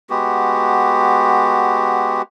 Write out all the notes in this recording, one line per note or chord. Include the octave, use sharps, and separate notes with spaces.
G#3 B3 F#4 G4